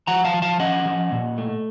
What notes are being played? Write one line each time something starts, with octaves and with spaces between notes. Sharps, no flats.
F3 F#5 A#5
F5 A5
F3
F5 A5
C#4 D#5 F#5
F3
A#2
A3